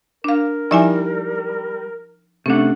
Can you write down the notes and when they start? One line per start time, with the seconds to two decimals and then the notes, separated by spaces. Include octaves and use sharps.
0.24 D4 A#4 F5
0.71 F3 G3 D#4 E4 D5 E5 G#5
2.46 C3 A3 C#4 D4 F#5